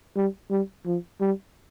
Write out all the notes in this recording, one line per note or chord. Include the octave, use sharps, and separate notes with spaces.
G3
G3
F3
G3